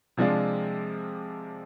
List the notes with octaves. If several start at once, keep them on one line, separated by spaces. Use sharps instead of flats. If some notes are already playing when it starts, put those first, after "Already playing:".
C3 F3 G#3 D4 F4